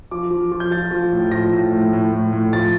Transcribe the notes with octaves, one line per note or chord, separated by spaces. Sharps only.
F3 D6
F3
F3
G6
F3 A6
F3
A2
F3 A#6
A2
A2
A2
A2
A2
F3 A6